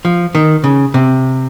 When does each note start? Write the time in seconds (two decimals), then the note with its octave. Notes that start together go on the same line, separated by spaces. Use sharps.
0.05 F3
0.35 D#3
0.64 C#3
0.94 C3